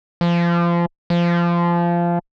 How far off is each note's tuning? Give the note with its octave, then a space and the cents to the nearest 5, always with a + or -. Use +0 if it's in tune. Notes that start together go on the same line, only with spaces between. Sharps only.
F3 -25
F3 -20